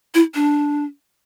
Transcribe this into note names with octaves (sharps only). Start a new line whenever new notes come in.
E4
D4